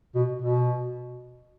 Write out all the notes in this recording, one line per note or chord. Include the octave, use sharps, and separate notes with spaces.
B2
B2